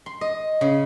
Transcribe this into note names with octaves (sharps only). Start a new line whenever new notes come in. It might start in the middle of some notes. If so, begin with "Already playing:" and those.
C6
D#5
C#3